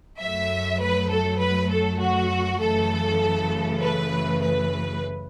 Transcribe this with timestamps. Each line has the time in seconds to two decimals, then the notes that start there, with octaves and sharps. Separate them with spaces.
0.20 F#2 F#3 A3 E5
0.80 B4
1.10 A4
1.40 B4
1.70 A4
2.00 F#4
2.60 F#2 C#3 E3 A3 A4
3.80 B4
4.40 B4